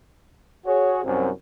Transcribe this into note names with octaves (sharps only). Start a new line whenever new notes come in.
F#4 G#4 C#5
C2 F#2 C4